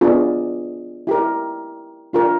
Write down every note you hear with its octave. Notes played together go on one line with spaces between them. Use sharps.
B3 D4 F4 G#4
E4 G4 A#4
D4 F4 A#4